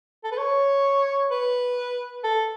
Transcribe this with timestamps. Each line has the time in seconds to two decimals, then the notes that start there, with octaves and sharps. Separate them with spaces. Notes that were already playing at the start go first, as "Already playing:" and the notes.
0.24 A4
0.32 B4
0.38 C#5
1.30 B4
2.24 A4